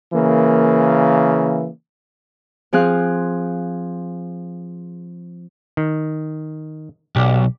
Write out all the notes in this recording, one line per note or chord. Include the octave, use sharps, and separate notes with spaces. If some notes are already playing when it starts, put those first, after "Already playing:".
C#3 E3 A#3
F3 C4 G#4 F5 F#6
D#3
B1 G4 D5